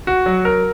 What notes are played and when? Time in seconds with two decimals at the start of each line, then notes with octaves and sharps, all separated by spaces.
0.07 F#4
0.26 F#3
0.45 A#4